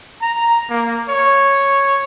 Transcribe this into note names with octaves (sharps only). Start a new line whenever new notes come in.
A#5
A#3
C#5